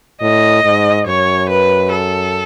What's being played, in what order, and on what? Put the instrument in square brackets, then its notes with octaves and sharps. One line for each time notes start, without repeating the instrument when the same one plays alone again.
[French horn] A2 [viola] D#5
[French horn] G#2
[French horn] F#2 [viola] C#5
[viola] B4
A4